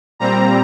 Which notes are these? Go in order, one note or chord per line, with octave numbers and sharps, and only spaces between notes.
A#2 G3 C4 A#5